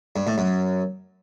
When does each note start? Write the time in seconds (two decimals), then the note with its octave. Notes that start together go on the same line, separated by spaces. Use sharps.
0.16 G2
0.27 A2
0.38 F#2